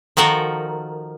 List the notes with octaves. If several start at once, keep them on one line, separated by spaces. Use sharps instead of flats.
D#3 F3 F#4 A4 A#4